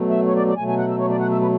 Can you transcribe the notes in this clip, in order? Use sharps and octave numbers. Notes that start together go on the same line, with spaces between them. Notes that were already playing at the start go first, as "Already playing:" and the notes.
Already playing: B2 F#3 A3
E5
C#5
D5
D5
B2 F#3 A3 G#5
G#5
F#5
E5
C#5
D5
F#5
E5
B4